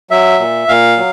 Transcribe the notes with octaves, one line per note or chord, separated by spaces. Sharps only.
F#3 E5
A#2
A#2 F5
F#3